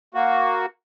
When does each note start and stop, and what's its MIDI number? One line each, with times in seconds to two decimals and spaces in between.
0.14 0.66 58
0.14 0.66 66